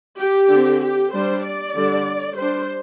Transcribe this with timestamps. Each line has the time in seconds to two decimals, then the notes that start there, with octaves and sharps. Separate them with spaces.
0.20 G4
0.51 D3 C4
0.82 G4
1.13 G3 D4 C5
1.45 D5
1.76 D3 G3 D4
2.37 G3 D4 C5